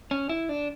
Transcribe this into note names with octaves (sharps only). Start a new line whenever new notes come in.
C#4
E4
D4